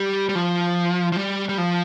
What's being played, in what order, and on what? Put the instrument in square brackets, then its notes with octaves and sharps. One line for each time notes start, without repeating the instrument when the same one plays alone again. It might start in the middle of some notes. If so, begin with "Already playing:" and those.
Already playing: [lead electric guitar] G3
G3
F3
F3
G3
G3
F3